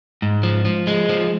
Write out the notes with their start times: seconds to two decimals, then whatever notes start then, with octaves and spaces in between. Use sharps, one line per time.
0.22 G#2
0.43 F3
0.65 F3
0.87 G#3
1.09 F3